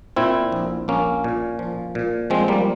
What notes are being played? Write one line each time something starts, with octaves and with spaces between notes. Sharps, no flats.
A#2 C4 E4
A#1
A#1 A#3 C#4
A#2
F3
A#2
F3 G#3 C4
G3 A#3